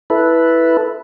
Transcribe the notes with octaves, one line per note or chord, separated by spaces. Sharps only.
E4 A4 B4